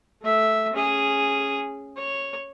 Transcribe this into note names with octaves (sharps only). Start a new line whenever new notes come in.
A3 E5
C#4 G#4
C#5